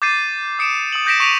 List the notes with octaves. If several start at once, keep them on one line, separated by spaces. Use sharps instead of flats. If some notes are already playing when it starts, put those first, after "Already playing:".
D6 G6 A6 C7 D#7
D#6 C#7 D7 E7
D#6 F#7
D#6 G6 A#6 B6 D7 E7
C#6 B6 D7 D#7 F7